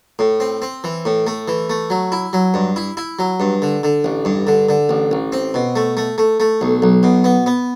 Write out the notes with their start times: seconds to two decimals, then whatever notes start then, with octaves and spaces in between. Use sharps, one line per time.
0.19 A2
0.40 C4
0.62 C4
0.84 E3
1.05 A2
1.27 A3
1.48 E3
1.70 A3
1.90 F#3
2.12 E4
2.33 F#3
2.54 G2
2.76 E4
2.97 E4
3.19 F#3
3.40 G2
3.62 D3
3.83 D3
4.04 A1
4.25 G2
4.47 D3
4.69 D3
4.89 A1
5.11 A1
5.32 C4
5.54 B2
5.76 A3
5.97 A3
6.18 A3
6.40 A3
6.61 B1
6.82 B1
7.03 B2
7.24 B3
7.46 B3